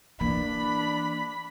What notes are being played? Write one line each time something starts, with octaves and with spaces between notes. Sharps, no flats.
E3 A#3 D4 B5